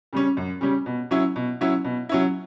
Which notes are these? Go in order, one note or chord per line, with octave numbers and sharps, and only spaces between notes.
C#3 G3 C#4
F#2
C#3 G3 C#4
B2
F#3 C#4 E4
B2
F#3 C#4 E4
B2
F#3 C#4 E4